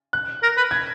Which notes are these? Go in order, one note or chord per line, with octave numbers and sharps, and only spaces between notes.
F#6
A#4
B4
G#6